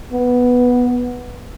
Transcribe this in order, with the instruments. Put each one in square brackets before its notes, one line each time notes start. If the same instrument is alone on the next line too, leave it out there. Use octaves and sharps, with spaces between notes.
[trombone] B3